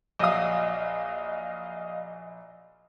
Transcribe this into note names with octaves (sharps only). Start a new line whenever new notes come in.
A#1 F#3 D#5 F5 D#6